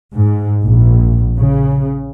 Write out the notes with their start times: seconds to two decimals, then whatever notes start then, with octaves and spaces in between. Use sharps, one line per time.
0.14 G#2
0.63 A#1
1.37 C#3